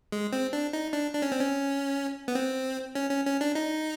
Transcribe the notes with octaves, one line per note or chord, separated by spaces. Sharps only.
G#3
C4
D4
D#4
D4
D4
C#4
C4
C#4
B3
C4
C#4
C#4
C#4
D4
D#4